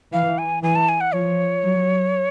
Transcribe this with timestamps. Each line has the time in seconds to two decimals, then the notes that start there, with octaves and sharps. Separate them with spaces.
0.13 E3 F5
0.38 G#5
0.63 E3 G#5
0.75 A5
0.89 G#5
1.01 F#5
1.13 F3 C#5
1.64 F#3